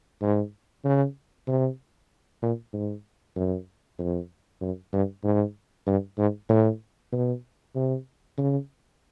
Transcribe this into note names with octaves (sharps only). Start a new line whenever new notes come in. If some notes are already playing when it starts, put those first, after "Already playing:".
G#2
C#3
C3
A#2
G#2
F#2
F2
F#2
G2
G#2
G2
G#2
A2
B2
C3
C#3